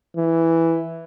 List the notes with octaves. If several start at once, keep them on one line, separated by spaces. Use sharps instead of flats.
E3